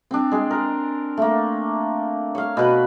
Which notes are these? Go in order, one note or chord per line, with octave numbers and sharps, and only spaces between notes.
C4 D4
G#3 C6
A#4
A3 A#3
C#5 F5
B2 B4